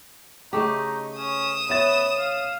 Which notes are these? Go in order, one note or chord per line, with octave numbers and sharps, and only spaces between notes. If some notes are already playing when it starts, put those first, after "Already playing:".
C#3 A3 D#4 G4
C#4 D#6 E7
B3 C#5 E5 A6
F5